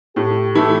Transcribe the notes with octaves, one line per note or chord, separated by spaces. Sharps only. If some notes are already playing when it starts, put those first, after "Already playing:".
A2 G4
E3 A3 E4